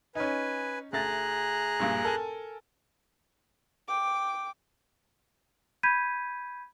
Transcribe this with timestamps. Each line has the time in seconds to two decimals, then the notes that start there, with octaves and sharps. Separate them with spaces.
0.15 C#4 D#4 B4 G#5
0.93 D2 A3 G#4 A#5 F#6 A6
1.80 A#1 G2 A#2
2.05 A4 A#4 G#5
3.88 G5 D6
5.83 B5 G6 G#6 B6 D#7